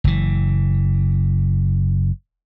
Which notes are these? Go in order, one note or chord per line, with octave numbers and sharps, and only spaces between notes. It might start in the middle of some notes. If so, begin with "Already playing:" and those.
F#1 E3